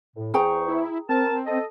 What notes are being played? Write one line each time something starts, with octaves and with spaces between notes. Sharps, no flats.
A2
E2 G#4 C5 G5 A#5 C#6
E4
C4 A#4 A5
A4 D#5